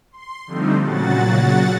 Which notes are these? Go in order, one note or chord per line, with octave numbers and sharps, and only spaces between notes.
C6
D3 F3 G3 A3 C4 D#4
A#2 C#3 F#3 F#4 F#5 A6